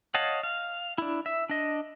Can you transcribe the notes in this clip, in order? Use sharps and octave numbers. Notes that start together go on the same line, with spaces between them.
C#5 D#5 F5 F#5 A5
F5
D4 E4
E5
D4 D#5